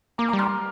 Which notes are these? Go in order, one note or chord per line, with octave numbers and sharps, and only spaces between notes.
A#3 A#5 D6
A#5 D6
G3
C6 F6